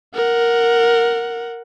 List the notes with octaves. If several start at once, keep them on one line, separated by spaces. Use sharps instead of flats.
A#4 F#5